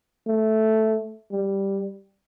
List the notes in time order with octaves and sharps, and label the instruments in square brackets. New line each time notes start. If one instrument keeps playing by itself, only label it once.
[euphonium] A3
G3